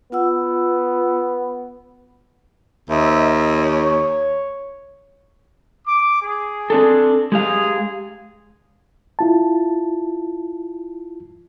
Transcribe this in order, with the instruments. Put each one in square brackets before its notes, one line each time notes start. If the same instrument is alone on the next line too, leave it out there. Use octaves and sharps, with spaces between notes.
[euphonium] B3 [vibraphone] F4 F#5 E6
[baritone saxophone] D#2 [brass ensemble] C5 D#5 E5
[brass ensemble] C#5
[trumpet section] D6
G#4
[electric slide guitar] C4 D4 A4
[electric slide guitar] G#3 G4 F5 [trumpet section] G#4
[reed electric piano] E4 F4 A5